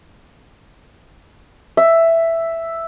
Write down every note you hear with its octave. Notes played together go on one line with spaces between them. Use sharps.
E5